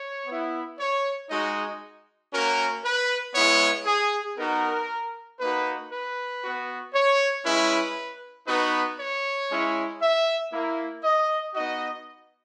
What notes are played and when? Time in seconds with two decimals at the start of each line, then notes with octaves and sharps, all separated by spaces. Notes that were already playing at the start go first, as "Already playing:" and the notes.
Already playing: C#5
0.26 B3 E4
0.78 C#5
1.30 G#3 D#4 F#4 D#5
2.32 A#3 C#4 F#4 A#4
2.84 B4
3.35 G#3 B3 E4 C#5
3.85 G#4
4.37 B3 D#4 F#4 A#4
5.39 A#3 D#4 F#4 B4
5.91 B4
6.42 B3 F#4
6.93 C#5
7.44 G#3 C#4 E4 B4
8.47 B3 D#4 F#4 B4
8.99 C#5
9.50 G#3 C#4 E4
10.01 E5
10.52 A#3 E4
11.03 D#5
11.54 B3 D#4 F#4 D#5